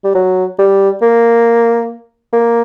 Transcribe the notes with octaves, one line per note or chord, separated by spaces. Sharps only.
G3
F#3
G3
A#3
A#3